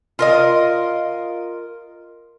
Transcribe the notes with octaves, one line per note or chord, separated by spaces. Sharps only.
F4 A#4 D#5